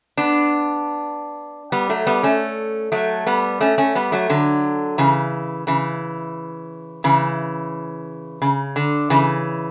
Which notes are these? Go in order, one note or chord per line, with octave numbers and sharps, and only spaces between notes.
B3 D4
G3 B3
F#3 A3
G3 B3
A3 C#4
F#3 A3
G3 B3
A3 C#4
A3 C#4
G3 B3
F#3 A3
D3 F#3
C#3 E3
C#3 E3
C#3 E3
C#3
D3
C#3 E3